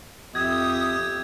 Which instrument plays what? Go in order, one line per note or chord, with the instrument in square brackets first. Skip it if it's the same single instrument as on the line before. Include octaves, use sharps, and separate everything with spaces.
[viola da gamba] F2 [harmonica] G4 E5 [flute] D#6 [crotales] G#6